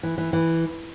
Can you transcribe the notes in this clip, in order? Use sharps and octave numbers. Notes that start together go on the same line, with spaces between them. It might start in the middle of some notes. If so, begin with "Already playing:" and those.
E3
E3
E3